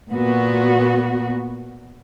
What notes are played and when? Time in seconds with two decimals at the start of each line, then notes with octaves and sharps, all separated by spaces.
0.10 A#2 B3 F#4